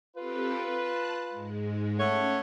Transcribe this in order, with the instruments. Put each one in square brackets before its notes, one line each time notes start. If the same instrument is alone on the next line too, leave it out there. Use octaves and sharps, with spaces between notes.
[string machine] C4 G4 A4 [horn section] F4 B4
[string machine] A5 F#6
G#2 G#3
[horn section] A3 C#5 F#5 [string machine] C#4